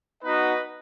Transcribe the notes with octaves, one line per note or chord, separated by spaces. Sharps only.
B3 D#4 F#4 B4 D#5